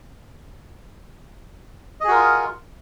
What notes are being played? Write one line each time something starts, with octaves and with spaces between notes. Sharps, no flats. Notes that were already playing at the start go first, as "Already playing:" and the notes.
F4 F#4 G#4 A#4 D#5